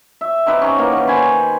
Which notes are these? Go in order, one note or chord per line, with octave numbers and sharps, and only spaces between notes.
E5
C4 D#4 G4 B4
C#4 A#5
E3 A#3 F#5
D#3 C#4
C5 G#5 B5